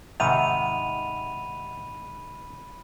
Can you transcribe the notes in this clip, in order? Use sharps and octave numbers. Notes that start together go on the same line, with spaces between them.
G#2 C3 D#3 E5 F#5 B5 D#7 F7